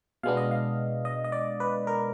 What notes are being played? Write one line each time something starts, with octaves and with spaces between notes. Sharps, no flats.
B2 G#3 B3 D4 F5
D#5
F5
D#5
D#5
D5
B4
A#4